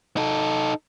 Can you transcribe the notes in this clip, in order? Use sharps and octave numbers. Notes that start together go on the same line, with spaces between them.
D#4 A4